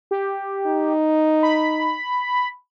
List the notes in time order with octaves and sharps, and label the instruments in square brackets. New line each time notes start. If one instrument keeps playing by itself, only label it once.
[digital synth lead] G4
[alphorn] D#4
[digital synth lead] B5